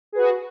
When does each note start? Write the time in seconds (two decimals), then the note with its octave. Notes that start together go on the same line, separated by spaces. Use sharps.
0.12 G#4
0.15 B4
0.18 F#4